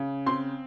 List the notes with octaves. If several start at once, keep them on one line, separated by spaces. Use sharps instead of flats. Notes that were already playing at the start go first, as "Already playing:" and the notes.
Already playing: C#3
C4 C6